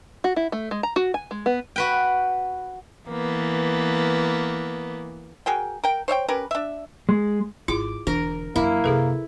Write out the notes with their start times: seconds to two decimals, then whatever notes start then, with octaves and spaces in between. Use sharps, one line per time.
0.24 F#4
0.36 E4
0.52 A3
0.71 G#3
0.83 A#5
0.96 F#4
1.14 G#5
1.31 G#3
1.46 B3
1.76 F#4 B4 G5
3.07 E3 A#3 B3
5.46 F#4 G#4 A#4 G5
5.84 A#4 G5
6.08 C5 C#5 E5 G5
6.28 C#4 G4 A#4 B4
6.51 D4 E5
7.09 G#3
7.68 G#1 E4 F4 G#4 D6
8.07 E1 D3 E3 D4 A#4
8.56 F#2 F#3 A#3 E4
8.84 F#2 C3 G#4 A4 B4